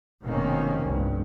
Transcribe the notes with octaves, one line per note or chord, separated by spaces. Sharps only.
F1 B2 D#3 A#3 C4 C#4
F1 C2 G2